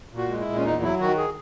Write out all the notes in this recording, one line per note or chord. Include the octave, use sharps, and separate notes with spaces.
A#2
F#4
G#3
E4
A#2
C#4
E2 D#4
F#3 E4
D#3 F#4
G#4